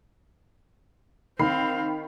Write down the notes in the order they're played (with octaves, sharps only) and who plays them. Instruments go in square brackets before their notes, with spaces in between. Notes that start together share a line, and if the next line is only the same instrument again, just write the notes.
[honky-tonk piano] D#3 B5 C7 [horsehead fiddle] C4 F5